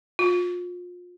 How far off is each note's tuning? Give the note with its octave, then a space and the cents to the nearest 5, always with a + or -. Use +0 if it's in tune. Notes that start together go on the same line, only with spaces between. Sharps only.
F4 +30